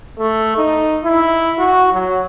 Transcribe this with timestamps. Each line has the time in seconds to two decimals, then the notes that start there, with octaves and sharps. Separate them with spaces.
0.19 A3
0.57 D#4
1.04 E4
1.59 F#4
1.93 F#3